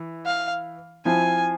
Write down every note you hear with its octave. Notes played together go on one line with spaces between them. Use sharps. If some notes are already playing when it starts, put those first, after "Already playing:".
Already playing: E3
F5
F3 C4 E4 G#5